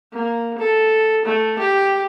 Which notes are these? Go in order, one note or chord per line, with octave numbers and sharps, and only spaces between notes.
A#3
A4
A3
G4